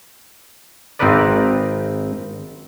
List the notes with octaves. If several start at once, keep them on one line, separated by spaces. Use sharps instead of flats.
G#1 C4 D#4 A#4 B4 D5